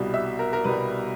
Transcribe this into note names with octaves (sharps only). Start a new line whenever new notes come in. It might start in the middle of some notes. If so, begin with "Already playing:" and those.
Already playing: C2 B2 G3
E5
A#4
A#4
C2 B2 G3 B4